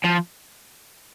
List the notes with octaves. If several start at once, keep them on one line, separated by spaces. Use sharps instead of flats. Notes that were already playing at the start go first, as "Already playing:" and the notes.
F3